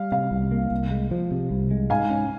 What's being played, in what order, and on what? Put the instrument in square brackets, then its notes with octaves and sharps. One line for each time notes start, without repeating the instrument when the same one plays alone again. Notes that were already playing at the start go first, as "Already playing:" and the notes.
Already playing: [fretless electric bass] G3 [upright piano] F5
[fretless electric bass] C3 [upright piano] F5
[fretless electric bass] C2
A#3
C2
G#3
F3
C3
C2
G#3
[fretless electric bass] G#2 [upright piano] F5 G#5
[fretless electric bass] C#4